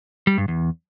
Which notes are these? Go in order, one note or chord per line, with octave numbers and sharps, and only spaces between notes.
G3
G2
E2